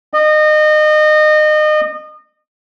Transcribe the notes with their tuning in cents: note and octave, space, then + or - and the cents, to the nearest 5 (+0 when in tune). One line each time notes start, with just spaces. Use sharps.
D#5 -30